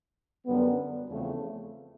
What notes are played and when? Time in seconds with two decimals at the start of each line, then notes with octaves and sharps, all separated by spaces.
0.46 F#2 D3 G3 B3
1.09 E2 C#3 F3 A3 C4